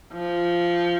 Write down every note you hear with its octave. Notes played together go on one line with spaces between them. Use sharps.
F3